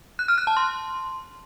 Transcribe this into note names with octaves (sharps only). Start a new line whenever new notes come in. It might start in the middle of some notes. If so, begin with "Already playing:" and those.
F#6
F6
F#6
A5
C6